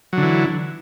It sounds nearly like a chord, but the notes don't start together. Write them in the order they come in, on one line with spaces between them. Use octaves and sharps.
F#3 D3 E3